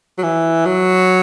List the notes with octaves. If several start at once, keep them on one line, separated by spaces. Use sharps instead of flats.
F#3
E3
F#3